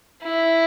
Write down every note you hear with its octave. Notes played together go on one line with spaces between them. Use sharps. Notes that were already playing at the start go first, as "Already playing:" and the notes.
E4